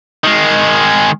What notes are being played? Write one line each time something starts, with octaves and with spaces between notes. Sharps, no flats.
D#3 G#3